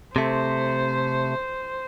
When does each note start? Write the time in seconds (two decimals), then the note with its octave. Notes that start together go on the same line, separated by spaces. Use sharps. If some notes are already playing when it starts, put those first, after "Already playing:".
0.16 C3 A3 C5